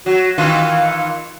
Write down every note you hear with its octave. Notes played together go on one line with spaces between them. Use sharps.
F#3 F#4
D#3 E3 F4 F5